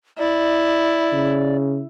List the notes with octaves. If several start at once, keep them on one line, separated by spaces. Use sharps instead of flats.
E4 D5
C#3